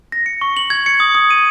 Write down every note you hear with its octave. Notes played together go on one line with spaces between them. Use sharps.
A#6
C#7
C#6
F#7
G#6
C#7
D#6
D#6
D#7